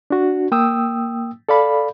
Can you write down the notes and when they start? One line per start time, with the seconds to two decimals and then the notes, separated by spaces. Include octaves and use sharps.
0.10 D4 F#4
0.52 A#3 G5 D#6 E6
1.49 A4 D5 F5 B5